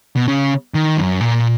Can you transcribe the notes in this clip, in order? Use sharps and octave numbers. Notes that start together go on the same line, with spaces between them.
B2
C#3
D#3
F#2
A#2